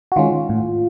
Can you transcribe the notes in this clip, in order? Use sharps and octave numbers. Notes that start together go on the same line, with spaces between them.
F#4
D#3 G#3 C#4 F4
A2